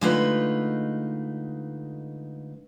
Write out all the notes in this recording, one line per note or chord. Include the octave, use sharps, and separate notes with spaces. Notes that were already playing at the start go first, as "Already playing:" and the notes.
D3 G#3 A3 D#4 F4 B4